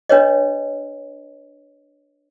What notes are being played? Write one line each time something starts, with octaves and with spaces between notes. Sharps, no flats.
D4 B4 C#5 D#5